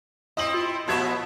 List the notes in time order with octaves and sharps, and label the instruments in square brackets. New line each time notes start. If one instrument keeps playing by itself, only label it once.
[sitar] C4 E4 [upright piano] D#5 D#6 F#7
[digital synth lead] F4
[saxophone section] B2 [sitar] F3 B4 E5 [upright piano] G4 A5 G#6